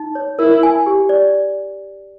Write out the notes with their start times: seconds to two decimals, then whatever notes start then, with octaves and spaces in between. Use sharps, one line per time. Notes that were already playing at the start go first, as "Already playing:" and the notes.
Already playing: D#4
0.15 C#5
0.39 E4 A#4
0.63 G#5
0.86 G4
1.09 D5